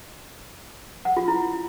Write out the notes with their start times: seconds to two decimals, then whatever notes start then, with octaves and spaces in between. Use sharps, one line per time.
1.05 F#5
1.17 F4
1.28 E4